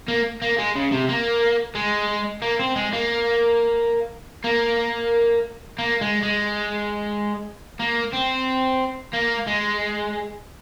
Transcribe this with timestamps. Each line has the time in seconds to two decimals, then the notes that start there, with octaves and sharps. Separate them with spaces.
0.08 A#3
0.42 A#3
0.58 G#3
0.75 C#3
0.92 C3
1.09 A#3
1.75 G#3
2.42 A#3
2.59 C4
2.76 G#3
2.93 A#3
4.44 A#3
5.79 A#3
6.01 G#3
6.23 G#3
7.80 A#3
8.13 C4
9.14 A#3
9.47 G#3